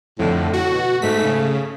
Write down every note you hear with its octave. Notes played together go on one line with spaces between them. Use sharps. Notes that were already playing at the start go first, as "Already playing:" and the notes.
F2 A2 D3
F#4
B2
G#2 A3 B6
C#3